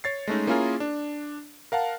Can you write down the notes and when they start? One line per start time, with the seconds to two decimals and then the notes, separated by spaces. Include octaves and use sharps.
0.04 C#5 A6 C7
0.28 G#3 A3 C#4 D#4
0.47 A#3 C#4 E4 F4 G#4 A#4
0.80 D4
1.72 A#4 F5 F#5 A5